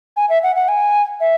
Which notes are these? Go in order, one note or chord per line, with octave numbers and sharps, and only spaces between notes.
G#5
E5
F#5
F#5
G#5
E5